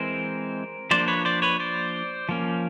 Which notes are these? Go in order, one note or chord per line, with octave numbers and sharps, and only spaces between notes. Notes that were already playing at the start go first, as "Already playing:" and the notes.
Already playing: E3 G#3 C4 A#4 C5
F3 A#3 D4 C5 D5
B4 C#5
C5 D5
B4 C#5
C5 D5
F3 A#3 C#4